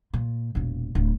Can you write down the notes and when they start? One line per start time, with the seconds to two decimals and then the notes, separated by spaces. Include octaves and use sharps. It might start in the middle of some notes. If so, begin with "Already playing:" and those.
0.14 A#2
0.55 E1 A#2
0.95 D1